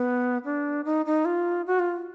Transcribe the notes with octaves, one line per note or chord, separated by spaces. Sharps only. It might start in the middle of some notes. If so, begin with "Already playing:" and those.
Already playing: B3
D4
D#4
D#4
F4
F#4
F4